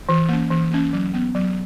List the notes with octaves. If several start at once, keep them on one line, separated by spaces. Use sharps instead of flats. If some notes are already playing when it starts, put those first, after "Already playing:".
E3
A#3 C#4
E3
A#3 C#4
F#3
B3
F#3